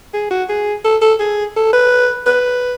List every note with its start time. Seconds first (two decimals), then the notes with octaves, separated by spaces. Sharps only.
0.14 G#4
0.31 F#4
0.49 G#4
0.84 A4
1.02 A4
1.20 G#4
1.56 A4
1.73 B4
2.26 B4